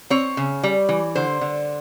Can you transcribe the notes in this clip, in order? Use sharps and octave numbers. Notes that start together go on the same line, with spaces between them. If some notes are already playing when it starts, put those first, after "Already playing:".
C4 C#5
C#3
G3
E3
D3 C5
D3